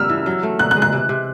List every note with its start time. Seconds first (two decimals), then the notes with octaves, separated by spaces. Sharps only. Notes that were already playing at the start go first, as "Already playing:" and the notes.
Already playing: G2 G3 B3 C#4 E6 F6
0.09 E3
0.26 F#3
0.43 A3
0.59 B2 F#6
0.71 F#6
0.76 G#3
0.82 F#6
0.92 C3
1.09 C3